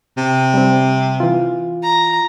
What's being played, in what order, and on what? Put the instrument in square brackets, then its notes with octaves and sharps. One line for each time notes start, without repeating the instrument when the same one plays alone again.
[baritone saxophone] C3
[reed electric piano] G3 C4
E3 F4
[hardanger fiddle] A#5